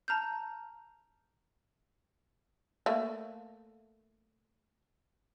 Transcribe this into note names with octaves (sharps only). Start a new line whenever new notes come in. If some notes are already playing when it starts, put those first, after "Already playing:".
A5 A#5 F6 G6
A3 A#3